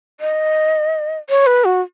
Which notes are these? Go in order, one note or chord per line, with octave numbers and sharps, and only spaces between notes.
D#5
C#5
B4
F#4